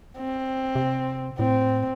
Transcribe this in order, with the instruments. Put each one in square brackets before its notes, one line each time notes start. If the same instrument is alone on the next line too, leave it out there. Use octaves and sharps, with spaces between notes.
[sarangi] C4
[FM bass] C3
[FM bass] A2 [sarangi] C4